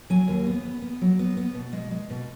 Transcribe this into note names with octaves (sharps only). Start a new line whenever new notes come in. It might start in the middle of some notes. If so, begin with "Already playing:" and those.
F#3 G#5
D#2
B3
B3
B3
F#3
B3
B3
B2
G#3
G#3
B2